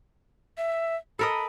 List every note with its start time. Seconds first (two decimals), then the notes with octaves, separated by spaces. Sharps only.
0.58 E5
1.19 A4 A#4 D#5 B5